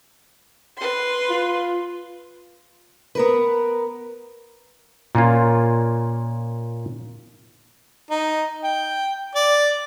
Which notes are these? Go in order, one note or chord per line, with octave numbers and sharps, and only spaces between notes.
B4 C6
F4
B3 A#4 B4
A#2 A#3 C#4 F4
D#4
G5
D5